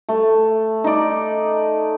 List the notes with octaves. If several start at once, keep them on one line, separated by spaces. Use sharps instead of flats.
A3
D#4 D5